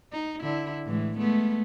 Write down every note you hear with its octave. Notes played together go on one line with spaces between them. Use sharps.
D#4
D3 E4
A2 E3 G#3
G#3 A3 B3